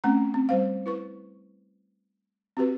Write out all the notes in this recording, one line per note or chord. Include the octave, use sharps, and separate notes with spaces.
A3 C4 C#4 F#5 A#5
C4
G3 C5 F5
E4 B4 C#6
C4 F#4 G4 B4